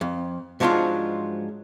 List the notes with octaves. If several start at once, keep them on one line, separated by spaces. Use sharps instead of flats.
F2
G#2 F3 F#3 G#3 D4 F4